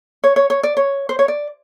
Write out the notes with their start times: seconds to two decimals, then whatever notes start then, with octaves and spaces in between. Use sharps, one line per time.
0.24 C#5
0.36 C#5
0.50 C#5
0.63 D5
0.77 C#5
1.09 C5
1.19 C#5
1.28 D5